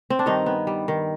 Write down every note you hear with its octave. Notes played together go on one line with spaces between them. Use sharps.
C4
D4
G2 D#3 D#4
B3
G3
D#3